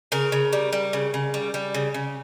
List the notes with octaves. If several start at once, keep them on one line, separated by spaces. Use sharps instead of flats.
C#3 A#4
C#3
G3
G3
C#3
C#3
G3
G3
C#3
C#3